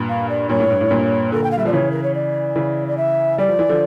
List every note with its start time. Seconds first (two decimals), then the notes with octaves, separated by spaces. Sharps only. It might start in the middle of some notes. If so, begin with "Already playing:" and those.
Already playing: G2 A#2
0.09 F5
0.29 D5
0.49 G2 A#2 C#5
0.60 A2
0.70 G2
0.81 A2
0.91 G2 A#2
1.32 A#2 D3 A#4
1.43 G5
1.51 F5
1.57 G3 E5
1.65 F3 D5
1.73 C#3 E3 C#5
1.91 A#4
2.03 C#5
2.14 D5
2.55 C#3 E3
2.88 D5
2.97 E5
3.38 G3 D5
3.49 F3
3.59 E3
3.69 D3 F3